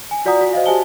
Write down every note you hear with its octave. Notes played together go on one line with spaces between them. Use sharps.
G#5
F4 F#4 D5 F#5 A#5 D#6
F#4
C5 D#5 F5
G4 C5 E5 G#5 A5 G7